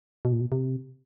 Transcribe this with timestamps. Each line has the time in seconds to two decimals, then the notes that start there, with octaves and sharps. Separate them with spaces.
0.25 B2
0.33 A#2
0.41 B2
0.52 C3